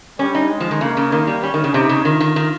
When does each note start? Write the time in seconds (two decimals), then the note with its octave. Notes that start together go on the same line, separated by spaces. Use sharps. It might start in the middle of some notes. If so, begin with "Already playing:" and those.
0.19 G3 C#4
0.35 D#4
0.50 G#3
0.61 F3
0.71 D#3
0.81 C#3 A#3
0.97 C#3
1.12 D#3 A#3
1.27 G3
1.43 G3 C#4
1.54 D#3
1.64 C#3
1.74 C3 D#4
1.89 C#3
2.05 D#3 F4
2.21 D#3
2.36 D#3